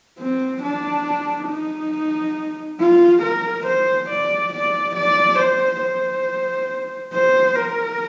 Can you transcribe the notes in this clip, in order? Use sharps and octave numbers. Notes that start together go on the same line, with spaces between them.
C4
D4
D#4
F4
A#4
C5
D5
D5
D5
C5
C5
C5
A#4